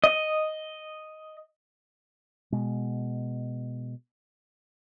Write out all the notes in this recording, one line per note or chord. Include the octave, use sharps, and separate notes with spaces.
D#5
B2 G#3